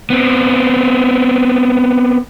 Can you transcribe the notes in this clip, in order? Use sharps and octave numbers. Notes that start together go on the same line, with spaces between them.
B3 C4